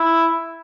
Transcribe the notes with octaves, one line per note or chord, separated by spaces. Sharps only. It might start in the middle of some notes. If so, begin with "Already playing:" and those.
Already playing: E4